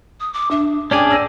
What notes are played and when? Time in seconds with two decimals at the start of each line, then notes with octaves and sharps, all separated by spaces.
0.20 D#6
0.33 D6
0.51 D4 E5
0.91 C#4 D4 G#4 D5 G5 D6
1.10 D5 E6 A#6 D#7